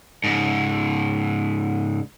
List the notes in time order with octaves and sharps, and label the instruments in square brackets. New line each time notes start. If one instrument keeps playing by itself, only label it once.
[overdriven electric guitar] G#2 C#3